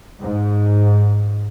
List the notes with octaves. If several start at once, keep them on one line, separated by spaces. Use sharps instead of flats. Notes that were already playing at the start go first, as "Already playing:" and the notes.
G#2